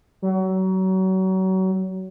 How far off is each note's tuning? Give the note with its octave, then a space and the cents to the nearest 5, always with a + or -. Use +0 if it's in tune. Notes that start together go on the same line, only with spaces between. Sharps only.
F#3 +30